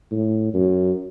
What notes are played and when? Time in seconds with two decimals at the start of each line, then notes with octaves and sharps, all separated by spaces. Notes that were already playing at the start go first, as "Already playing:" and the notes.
0.11 A2
0.54 F#2